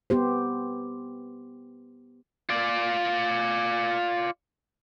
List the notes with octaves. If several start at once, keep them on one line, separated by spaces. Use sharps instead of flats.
B3 G4 C5
F4 D5